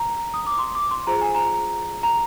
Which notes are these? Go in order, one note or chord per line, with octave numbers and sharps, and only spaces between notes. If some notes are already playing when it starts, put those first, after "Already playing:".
Already playing: A#5
D#6
D6
C6
D6
C6
F4 G#4 C5 A#5
G#5
A#5
A#5